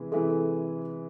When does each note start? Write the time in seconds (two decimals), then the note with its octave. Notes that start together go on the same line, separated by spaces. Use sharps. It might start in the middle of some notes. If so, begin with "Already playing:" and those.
Already playing: C3 E3 G#3
0.12 C3 E3 G#3 A4
0.30 A4